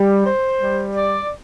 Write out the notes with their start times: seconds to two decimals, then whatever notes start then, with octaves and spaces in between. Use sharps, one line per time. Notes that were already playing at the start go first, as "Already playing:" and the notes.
Already playing: G3
0.25 C5
0.60 G3
0.95 D5